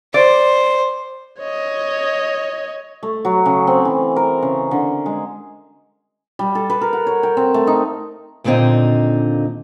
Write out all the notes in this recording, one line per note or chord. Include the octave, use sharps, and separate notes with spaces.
C5 D5
C#5 D#5
A3
F#3
C#3
C4
E3
A#4
C#3
D3
G#3
G3
A4
B4
A#4
F#5
C#5
G5
C4
A3
D#4
D#2 A#2 D3 B3 C4 D#4